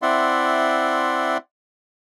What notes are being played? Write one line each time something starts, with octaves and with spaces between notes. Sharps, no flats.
C4 E4 D5 E5 F#5 C6